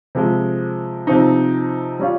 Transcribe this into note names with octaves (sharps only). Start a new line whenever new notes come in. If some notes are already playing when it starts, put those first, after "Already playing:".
C3 F3 G#3
C3 F3 C4 D#4
G3 C#4 F4